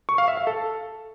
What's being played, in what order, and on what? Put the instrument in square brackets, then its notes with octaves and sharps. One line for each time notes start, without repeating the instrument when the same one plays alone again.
[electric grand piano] C#6
F5
E5
F5
A4